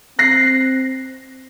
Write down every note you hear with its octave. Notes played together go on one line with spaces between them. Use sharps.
C4 F#6 A#6 C7